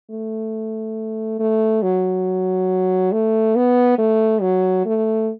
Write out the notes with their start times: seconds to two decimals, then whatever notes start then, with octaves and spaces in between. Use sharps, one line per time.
0.10 A3
1.39 A3
1.82 F#3
3.12 A3
3.55 B3
3.98 A3
4.41 F#3
4.85 A3